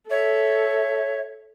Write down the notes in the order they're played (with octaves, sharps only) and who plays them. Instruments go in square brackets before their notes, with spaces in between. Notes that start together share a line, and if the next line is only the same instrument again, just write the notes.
[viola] A4 [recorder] C#5 [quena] E5